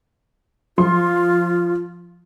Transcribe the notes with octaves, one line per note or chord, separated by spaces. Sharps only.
F3 F4 C6